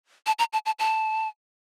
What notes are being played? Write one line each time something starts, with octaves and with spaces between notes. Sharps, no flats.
A5
A#5
A5
A5
A5